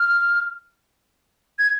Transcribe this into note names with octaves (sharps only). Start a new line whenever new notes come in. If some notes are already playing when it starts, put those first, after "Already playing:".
Already playing: F6
G#6